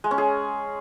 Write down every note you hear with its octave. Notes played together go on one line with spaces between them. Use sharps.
G#3
C#4
G#4